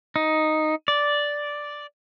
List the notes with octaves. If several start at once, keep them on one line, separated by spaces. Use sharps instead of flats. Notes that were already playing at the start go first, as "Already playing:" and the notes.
D#4
D5